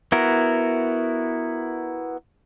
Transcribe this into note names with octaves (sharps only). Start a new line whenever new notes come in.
B3 E4 F#4 A#4